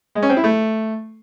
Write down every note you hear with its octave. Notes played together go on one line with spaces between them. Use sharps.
G#3
C#4
C4
E4
A3